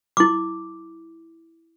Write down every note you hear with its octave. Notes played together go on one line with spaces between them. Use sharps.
E4 D6